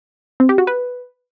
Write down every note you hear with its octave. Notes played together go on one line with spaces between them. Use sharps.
C4
G4
F#4
B4